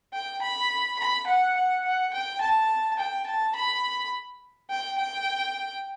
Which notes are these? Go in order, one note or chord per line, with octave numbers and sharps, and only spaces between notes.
G5
B5
B5
F#5
F#5
F#5
G5
A5
G5
A5
B5
G5
G5